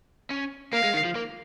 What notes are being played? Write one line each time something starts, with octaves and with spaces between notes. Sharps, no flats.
C#4
A#3 F5
G#3
D#3
F3
A#3